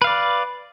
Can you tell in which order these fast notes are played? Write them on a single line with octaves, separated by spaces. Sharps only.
B4 F5 D5